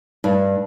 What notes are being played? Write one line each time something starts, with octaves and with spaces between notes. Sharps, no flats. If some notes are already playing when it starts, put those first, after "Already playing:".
G2